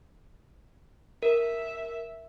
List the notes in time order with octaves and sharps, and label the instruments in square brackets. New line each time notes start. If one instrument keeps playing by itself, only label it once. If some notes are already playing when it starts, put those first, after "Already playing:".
[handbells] A#4 [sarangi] E5